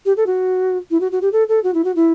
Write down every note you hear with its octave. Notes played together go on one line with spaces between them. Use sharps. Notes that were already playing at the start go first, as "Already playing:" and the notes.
G4
A4
F#4
E4
F#4
F#4
G4
A4
A4
F#4
E4
F#4
E4